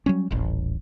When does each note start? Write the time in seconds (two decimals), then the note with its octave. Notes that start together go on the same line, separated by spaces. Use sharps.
0.06 F#3 G3 C#4
0.31 D#1 A1